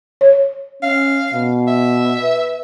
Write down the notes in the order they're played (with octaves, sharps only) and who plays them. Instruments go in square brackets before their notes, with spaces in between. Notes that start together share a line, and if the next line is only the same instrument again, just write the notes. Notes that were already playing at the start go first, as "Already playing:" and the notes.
[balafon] C#5
[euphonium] C#4 [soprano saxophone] F5
[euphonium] B2
[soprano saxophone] E5
[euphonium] B4